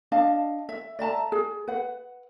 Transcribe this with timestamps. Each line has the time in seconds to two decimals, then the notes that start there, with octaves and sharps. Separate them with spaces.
0.12 D4 D#5 F5 A5
0.69 E5
0.99 D5 E5 A5 A#5
1.32 G#4
1.68 B4 F#5